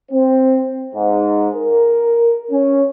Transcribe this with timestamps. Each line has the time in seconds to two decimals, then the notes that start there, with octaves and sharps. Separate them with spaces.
0.12 C4
0.94 G#2
1.56 A#4
2.51 C#4